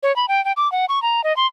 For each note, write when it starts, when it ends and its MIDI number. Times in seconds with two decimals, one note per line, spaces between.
0.03 0.14 73
0.16 0.26 83
0.28 0.43 79
0.45 0.52 79
0.57 0.70 86
0.72 0.85 78
0.89 1.02 85
1.02 1.23 82
1.24 1.35 75
1.36 1.47 84